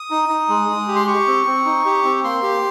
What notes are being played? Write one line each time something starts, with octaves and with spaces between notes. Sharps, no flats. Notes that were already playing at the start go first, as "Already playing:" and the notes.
Already playing: D#6
D#4
D#4
G#3
G#3
G4
C6
G4 C#6
C4
C4
D#4
G4
C4
A#3 C6
G4